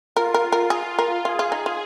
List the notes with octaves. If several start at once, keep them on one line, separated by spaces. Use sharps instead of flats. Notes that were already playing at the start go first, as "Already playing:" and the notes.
F4 A#4
A#4
A#4
F4 G#4
A#4
F4 G#4
F4
D#4
F4